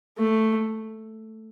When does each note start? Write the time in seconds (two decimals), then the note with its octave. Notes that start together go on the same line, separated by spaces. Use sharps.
0.18 A3